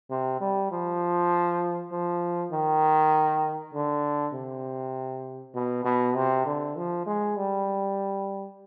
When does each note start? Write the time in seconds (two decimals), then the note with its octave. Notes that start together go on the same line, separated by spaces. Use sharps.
0.10 C3
0.41 G3
0.72 F3
1.92 F3
2.52 D#3
3.74 D3
4.34 C3
5.55 B2
5.85 B2
6.15 C3
6.46 D3
6.76 F3
7.06 G#3
7.36 G3